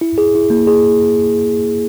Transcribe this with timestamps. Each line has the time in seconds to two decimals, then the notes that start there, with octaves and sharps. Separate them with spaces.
0.01 E4
0.18 G#4
0.35 E4
0.50 A#3
0.67 G#4